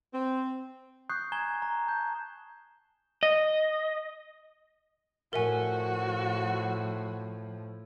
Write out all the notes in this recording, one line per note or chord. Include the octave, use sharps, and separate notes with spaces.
C4
C#6 D#6 F#6 G6 C7
G#5 A#5 G#6 E7 G7
A#5
A5 G6
D#5
A2 F3 F#4 A#4 E5 G#5